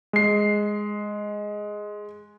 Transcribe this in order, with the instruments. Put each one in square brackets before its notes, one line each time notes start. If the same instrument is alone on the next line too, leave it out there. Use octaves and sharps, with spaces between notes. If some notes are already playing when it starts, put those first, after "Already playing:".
[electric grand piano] G#3 C7